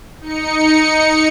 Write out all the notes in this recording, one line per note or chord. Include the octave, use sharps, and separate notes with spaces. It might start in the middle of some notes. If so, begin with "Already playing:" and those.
D#4 C#7